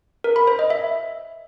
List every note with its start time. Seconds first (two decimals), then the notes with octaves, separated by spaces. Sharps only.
0.24 A#4
0.36 B5
0.47 C5
0.59 D#5
0.70 E5